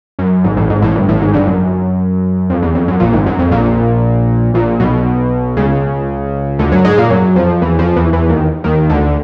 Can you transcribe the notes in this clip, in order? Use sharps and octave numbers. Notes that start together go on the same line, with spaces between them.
F#2
G#1 G#2
A1 A2
G#1 G#2
A1 A2
G1 G2
A1 A2
G#1 G#2
G1 G2
F#2
F2
E2
F2
F#2
A#1 A#2
G#1 G#2
F#2
F2
A#1 A#2
A#1 A#2
B1 B2
C#2 C#3
D2 D3
F#2 F#3
G#2 G#3
A#2 A#3
F#2 F#3
F2 F3
E2 E3
F2 F3
E2 E3
E2 E3
D#2 D#3
D#2 D#3
D2 D3